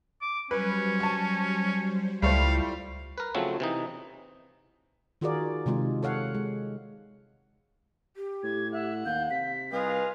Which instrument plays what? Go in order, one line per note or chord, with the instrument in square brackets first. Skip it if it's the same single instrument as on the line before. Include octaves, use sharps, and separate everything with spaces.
[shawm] D6
[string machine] F#3 G3 C5 [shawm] C#4 [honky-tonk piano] B4
[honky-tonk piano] A5 C#6
[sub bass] C#2 [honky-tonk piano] G3 A3 C5 [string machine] E4 F4 [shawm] F5
[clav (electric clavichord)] A#4 B4
C#3 F3 F#3 A3 C4
C3 E3 D#4
[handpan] D#3 F4 F#4 G#4 A#4 D5
C3 D#3 G#3 F4
A4 C#5 F5 F#5
G#3
[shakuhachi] G4
[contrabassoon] A2 [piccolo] G#6
[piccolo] E5 [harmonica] F#5
[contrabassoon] D#2 [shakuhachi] F5 [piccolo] G6
[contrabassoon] C3 [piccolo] B6
[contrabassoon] C2 [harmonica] F4 G#4 D#5 [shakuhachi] B4 [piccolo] F5